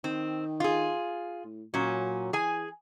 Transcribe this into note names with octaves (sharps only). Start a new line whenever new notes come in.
D#3 C4
F4 G#4
A2
A#2 F#3 C#4
E3 G#4 G#5